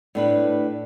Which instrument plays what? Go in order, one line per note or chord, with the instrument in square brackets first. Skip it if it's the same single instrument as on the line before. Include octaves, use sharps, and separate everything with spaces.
[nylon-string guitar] A2 D4 B4